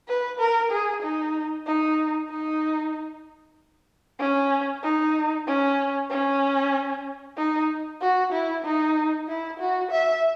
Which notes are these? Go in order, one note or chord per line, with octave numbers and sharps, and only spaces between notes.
B4
A#4
G#4
D#4
D#4
D#4
C#4
D#4
C#4
C#4
D#4
F#4
E4
D#4
E4
F#4
E5